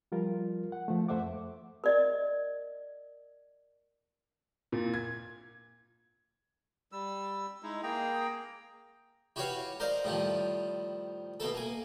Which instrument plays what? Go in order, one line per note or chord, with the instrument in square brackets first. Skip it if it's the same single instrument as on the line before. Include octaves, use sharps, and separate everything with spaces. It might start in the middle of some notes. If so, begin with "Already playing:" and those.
[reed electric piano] F3 G3 F4 A#4
F#5
F3 A3
F2 A3 C5 E5 F#5 D6
[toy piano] A#4 D5 D#5
[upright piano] A#2
G#6
[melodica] G3 E6
G#3 D#4 E4
A#3 G#4 G5 A#5
[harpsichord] E4 F#4 G4 B4 C#5 F5
A#4 C5 D5 D#5 F5
A2 D#3 F3 G3
B2 A3 A#3 A4
A#3 G#5